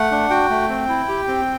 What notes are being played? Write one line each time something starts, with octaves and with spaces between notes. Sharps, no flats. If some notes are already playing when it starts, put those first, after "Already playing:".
Already playing: A3 F#5
D4
F#4 G5
A3
C4
E4
G4
C4